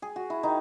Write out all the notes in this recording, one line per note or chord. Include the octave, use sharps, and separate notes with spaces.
G#4
F#4
E4
D#3 D#4